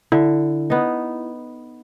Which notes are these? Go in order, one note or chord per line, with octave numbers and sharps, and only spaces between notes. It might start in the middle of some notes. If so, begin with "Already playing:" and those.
D3 E4
B3 D#4